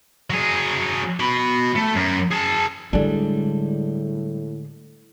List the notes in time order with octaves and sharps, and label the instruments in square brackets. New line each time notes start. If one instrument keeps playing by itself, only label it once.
[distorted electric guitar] F#3 G#4
F#4 B5
A3
F#2
G#4 A5
[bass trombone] A2 [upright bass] D3 G#3 [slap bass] G3 [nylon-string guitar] D4 G#4 A4